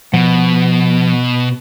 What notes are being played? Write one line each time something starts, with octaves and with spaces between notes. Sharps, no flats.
B2 F3 F#5